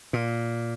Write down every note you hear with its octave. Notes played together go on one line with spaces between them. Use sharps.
A#2